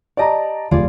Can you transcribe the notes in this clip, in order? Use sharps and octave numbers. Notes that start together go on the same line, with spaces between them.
G4 D5 D#5 A5 A#5
F1 F4 G#4 D5